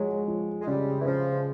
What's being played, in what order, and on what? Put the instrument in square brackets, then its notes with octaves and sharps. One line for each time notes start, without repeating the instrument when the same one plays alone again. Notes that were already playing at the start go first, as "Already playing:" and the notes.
Already playing: [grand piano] F3 G#3 [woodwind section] F#3
[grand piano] F3
[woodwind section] G#3
[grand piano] C#3 [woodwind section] G3
[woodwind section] E3
[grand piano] C#3 [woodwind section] F3